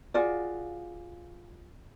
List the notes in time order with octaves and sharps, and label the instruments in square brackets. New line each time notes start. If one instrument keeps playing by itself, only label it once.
[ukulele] F4 F#4 G#4 D5